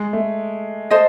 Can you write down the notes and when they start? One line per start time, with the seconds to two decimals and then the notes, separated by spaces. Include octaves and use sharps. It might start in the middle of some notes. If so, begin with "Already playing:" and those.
Already playing: G#3
0.13 A3
0.90 A4 C5 D#5